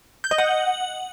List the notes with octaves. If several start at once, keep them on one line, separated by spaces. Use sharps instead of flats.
G6
D#5
F#5